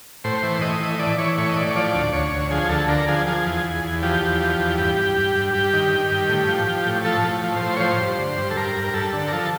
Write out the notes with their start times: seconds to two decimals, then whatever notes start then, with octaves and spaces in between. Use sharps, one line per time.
0.24 A2 C5
0.43 E3
0.61 A2 D#5
0.80 E3
0.95 D#5
0.99 E3 D5
1.18 E3 C#5
1.37 A2 C#5
1.49 D#5
1.57 A2 D5
1.70 C#5
1.76 F3 D5
1.94 D2
2.13 D2 C#5
2.32 D2
2.51 F3 G#4
2.69 D2 A4
2.88 D3 A#4
3.08 F3 G#4
3.27 F3 G#4
3.46 E2
3.64 E2
3.84 E2
4.02 F3 G4
4.21 E2
4.40 F3
4.59 E2
4.78 G2
4.96 G2
5.17 G2
5.36 G2
5.54 G2 G4
5.73 D#3
5.91 D#3
6.11 G2
6.29 A2
6.48 F3
6.67 F3
6.86 A2
7.05 F3 A4
7.24 A2
7.44 F3
7.56 C5
7.62 A2
7.77 C#5
7.80 F3 C5
8.00 G2
8.18 D3
8.38 G2
8.51 A4
8.56 G2 A#4
8.76 G2
8.84 A#4
8.94 G2 A4
9.13 D3
9.28 A#4
9.33 F3 A4